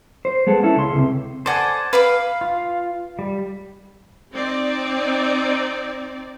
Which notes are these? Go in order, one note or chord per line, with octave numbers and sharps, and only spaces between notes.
C5
G#3 B3 A4
C#4 E4 A4
C#2 C6
C#2 C3
A4 C5 D5 F#5 G#5
B4 F5 B5 D6
F4
G3
C4 D#4 D5